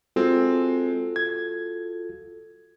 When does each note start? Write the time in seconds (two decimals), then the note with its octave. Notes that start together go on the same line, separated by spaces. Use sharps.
0.16 G#3 C4 F4 F#4 A4
1.16 G#6